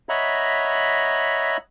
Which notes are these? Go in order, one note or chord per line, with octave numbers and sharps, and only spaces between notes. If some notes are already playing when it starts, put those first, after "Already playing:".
C#5 D#5 E5 F#5 A#5 B5